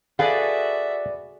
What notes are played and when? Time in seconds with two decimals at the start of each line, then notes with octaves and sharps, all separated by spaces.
0.19 F#4 G#4 A4 B4 D5 E5 F5